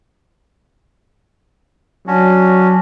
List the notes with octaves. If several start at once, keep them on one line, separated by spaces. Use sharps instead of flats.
F#3 C#4 D4 F#4